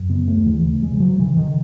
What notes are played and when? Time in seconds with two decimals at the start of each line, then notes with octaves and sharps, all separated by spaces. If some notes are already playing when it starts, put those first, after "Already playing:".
Already playing: F#2
0.09 C#3 B3
0.28 A3
0.37 D#2
0.46 E3
0.64 C#3 A3
0.82 G#3
0.91 C#3 E3
1.00 F#3
1.19 C#3 E3
1.37 D#3
1.47 C#3